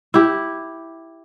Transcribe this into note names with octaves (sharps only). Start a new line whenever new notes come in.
E4 G4